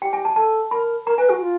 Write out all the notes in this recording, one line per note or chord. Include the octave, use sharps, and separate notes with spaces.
G4 G5
G#5
A5
A4 A5
A#4 B5
A#4 A#5
B4 G#5
F#4 G#5
F4